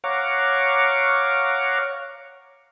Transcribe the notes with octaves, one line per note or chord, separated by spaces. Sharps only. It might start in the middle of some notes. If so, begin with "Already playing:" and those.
C#5 F5 F#5 A#5 C#6 D6